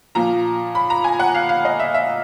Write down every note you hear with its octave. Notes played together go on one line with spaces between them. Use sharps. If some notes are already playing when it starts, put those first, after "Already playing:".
A#2 F3 A#5
B5
A#5
G#5
F#5
F5
F5
D#5
E5
E5